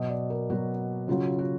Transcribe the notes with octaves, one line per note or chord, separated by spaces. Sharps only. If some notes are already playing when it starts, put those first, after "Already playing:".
Already playing: B2 F#3 D#5
D5
A#4
B2 F#3 F#4
C#3 F#3 F4
F#4